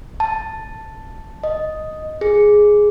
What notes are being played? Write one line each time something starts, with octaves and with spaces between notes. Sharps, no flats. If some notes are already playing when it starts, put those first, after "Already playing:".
A5
D#5
G#4